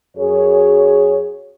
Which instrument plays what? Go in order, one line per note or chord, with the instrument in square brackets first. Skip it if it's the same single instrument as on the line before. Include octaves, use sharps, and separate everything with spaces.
[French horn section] F#2 G#4 C#5